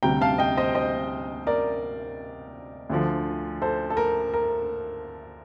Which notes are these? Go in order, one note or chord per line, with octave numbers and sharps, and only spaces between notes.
D2 C3 G3 G5 A#5
F5 A5
D#5 G5
C5 D#5
C5 D#5
A#4 D5
D2 D3 F3
A4 C5
A4
A#4
A#4